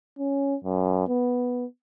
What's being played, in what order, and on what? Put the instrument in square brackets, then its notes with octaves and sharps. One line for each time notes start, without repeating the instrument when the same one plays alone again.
[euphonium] C#4
F#2
B3